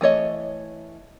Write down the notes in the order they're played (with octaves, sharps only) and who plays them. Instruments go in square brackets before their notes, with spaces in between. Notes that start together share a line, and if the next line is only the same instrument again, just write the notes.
[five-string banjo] E3 A3 C#5 D#5